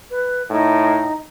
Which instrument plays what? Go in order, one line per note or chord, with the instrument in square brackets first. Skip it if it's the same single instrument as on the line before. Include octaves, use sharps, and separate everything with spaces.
[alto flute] B4
[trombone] A2 [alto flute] D#4